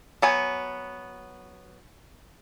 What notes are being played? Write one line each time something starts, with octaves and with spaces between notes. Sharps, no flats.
F#3 B3 G#5